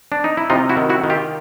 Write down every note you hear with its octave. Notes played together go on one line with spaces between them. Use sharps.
D4
D#4
E4
C3 D#4 F4
E4 F#4
D#3
E4 F#4
D#3
F4 G4